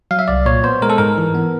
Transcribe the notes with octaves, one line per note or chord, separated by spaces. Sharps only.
F#3 F5
E5
C2 D5
A#2 C#5
B3 C5
G#3 A#4
A4
G#2 A#4
E3
B3